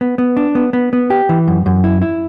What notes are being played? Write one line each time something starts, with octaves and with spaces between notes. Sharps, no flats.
B3
B3
D4
B3
B3
B3
G4
E3
F#2
F#2
E4
E4